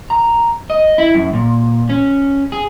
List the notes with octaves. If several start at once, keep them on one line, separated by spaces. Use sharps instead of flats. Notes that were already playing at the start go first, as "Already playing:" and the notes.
A#5
D#5
E4
F#2
A#2
C#4
G#4